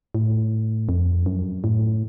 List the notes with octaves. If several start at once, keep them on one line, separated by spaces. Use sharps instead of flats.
A2
F2
F#2
A2